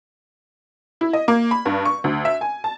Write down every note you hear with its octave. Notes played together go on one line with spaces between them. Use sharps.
E4
D#5
A#3
B5
G2
C#6
D2
E5
G#5
A5